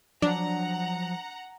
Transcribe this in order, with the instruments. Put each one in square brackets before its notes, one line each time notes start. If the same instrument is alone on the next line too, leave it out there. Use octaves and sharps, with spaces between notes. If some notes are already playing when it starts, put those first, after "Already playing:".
[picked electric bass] F3 F#3 [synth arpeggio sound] D4 [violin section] F#5 A#5